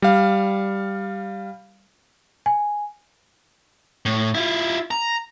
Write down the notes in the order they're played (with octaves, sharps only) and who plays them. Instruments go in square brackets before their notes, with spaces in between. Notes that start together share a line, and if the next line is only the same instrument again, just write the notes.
[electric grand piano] G3 F5
[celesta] G#5
[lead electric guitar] A2
E4 F4
A#5